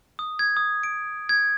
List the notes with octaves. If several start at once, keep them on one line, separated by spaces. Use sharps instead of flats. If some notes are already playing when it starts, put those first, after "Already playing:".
D#6
G#6
D#6
D7
G#6